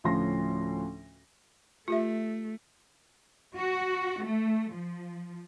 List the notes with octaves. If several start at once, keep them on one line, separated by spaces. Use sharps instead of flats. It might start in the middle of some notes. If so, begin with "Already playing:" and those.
D2 A2 F3 C#4 C6 A#6
A3 F4 G4 E5
F#4
A3
F3